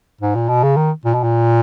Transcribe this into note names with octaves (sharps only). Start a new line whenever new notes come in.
G#2
A#2
B2
C#3
D#3
A#2
B2
A#2